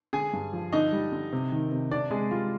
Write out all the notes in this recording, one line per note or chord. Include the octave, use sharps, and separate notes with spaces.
D3 G#4 G#5
G2
F3
D3 D#4 D#5
G3
D3
C3
D#3
C3
C3 D4 D5
C3 G#3 G#4
G3 F4